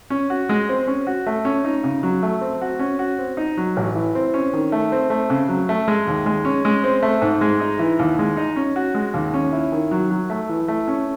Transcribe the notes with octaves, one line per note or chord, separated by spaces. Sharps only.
C#4
F#4
G#3
C4
C#4
F#4
A3
C#4
D#4
C#3
F#3
A3
C4
F#4
C#4
F#4
C4
D#4
F#3
A1
E3
C4
C#4
D#3
A3
C4
A3
C#3
F#3
A3
G#3
D#2
G#3
C#4
G#3
C4
A3
G#2
G#3
D#4
E3
D#2
G#3
D#4
C#4
F#4
G#3
D#2
C#4
E4
D#3
F#3
F#3
A3
E3
A3
C#4